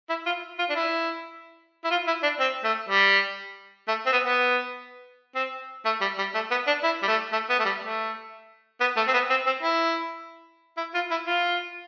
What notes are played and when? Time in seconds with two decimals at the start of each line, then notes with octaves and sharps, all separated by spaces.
0.10 E4
0.27 F4
0.59 F4
0.70 D4
0.76 E4
1.85 E4
1.91 F4
2.08 E4
2.23 D4
2.40 C4
2.64 A3
2.89 G3
3.88 A3
4.06 C4
4.13 B3
4.25 B3
5.36 C4
5.86 A3
6.01 G3
6.19 G3
6.35 A3
6.51 B3
6.67 D4
6.84 E4
7.03 G3
7.08 A3
7.33 A3
7.50 B3
7.59 A3
7.65 G3
7.82 A3
8.81 B3
8.97 A3
9.08 C4
9.14 B3
9.30 C4
9.47 C4
9.63 E4
10.78 E4
10.95 F4
11.11 E4
11.27 F4